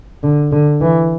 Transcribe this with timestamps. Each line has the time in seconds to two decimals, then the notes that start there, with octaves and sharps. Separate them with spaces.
0.23 D3
0.52 D3
0.81 E3